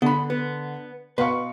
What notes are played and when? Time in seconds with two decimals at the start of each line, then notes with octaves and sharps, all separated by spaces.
0.02 D3 B3 B5
0.30 B3
1.18 B2 B4 F5 C6 C#6